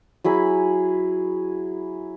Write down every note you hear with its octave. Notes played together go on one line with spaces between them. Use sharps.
F#3 E4 G#4 B5